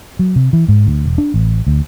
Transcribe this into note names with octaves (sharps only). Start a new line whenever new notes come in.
F#3
C3
E3
G#2
D2
E1
D4
A1
D2